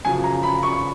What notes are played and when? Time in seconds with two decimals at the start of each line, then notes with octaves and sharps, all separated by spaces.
0.05 F#2 C#3 F3 G#5
0.24 A#5
0.43 B5
0.63 C#6